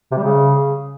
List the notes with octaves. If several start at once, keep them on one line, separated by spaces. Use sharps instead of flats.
C3
G3
C#3